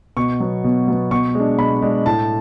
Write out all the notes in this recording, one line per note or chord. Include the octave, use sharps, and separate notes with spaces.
B2 C#6
F#3 B3
B2
F#3 B3
B2 C#6
G#3 D4
B2 B5
G#3 D4
A2 A5